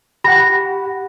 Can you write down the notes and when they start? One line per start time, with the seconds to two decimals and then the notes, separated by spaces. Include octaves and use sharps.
0.24 G4 F#5 B5 A#6